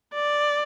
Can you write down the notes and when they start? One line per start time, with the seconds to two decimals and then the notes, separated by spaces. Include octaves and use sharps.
0.14 D5